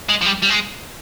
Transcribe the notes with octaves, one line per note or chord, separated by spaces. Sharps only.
G#3
F3
G3
G3
G#3